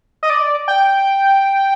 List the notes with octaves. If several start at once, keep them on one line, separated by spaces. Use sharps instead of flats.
D#5
D5
G5